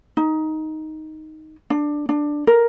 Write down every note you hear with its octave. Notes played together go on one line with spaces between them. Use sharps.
D#4
D4
D4
A#4